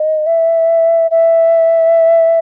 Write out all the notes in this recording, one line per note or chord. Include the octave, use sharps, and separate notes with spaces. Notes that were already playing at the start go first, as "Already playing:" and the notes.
Already playing: D#5
E5
E5